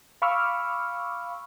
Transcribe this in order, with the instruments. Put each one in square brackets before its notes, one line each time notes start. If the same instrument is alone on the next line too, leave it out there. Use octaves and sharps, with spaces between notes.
[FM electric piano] F5 B5 C#6 D6 E6 F6